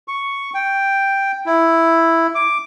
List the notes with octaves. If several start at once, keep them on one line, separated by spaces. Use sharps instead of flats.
C#6
G5
E4
D6